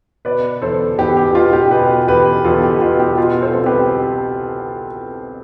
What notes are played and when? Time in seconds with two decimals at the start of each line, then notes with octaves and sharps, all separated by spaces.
0.25 B2 B4 D5
0.62 E2 A4 C5
0.98 E2 G4 B4
1.17 G4
1.34 B2 F4
1.53 G4
1.71 B2 G4 B4
2.08 E2 G4 B4
2.45 E2 F4 A4
2.63 G4
2.81 B2 F4
2.99 G4
3.18 B2 F4
3.42 A4 C5
3.54 C2
3.66 G4 B4